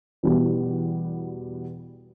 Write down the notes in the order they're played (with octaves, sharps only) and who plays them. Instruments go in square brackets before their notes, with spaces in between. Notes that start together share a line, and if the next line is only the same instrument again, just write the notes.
[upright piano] E2 B2 G3 B3 F#4